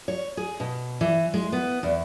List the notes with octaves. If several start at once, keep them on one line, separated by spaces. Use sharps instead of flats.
C#5
G#4
B2
E3
G#3
B3
E2